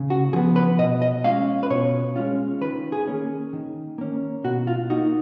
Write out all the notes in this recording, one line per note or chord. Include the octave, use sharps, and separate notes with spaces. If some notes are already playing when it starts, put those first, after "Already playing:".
Already playing: C#3
F#4
F3 B3 G#4
B4
B2 D#5
D#5
G#3 C#4 F4 F5
B4
B2 C#5
G#3 C#4 F4
D#3 B4
G#4
A#3 C#4
D#3
A#3 C#4
B2 F#4
F4
A#3 D#4 F#4